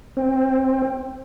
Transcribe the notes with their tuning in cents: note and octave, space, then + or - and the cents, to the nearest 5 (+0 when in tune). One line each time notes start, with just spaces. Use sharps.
C4 +15